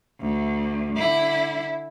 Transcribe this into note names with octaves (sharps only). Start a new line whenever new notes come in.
D2
D3 E4